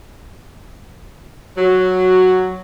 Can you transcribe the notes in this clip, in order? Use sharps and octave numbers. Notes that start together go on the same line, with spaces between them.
F#3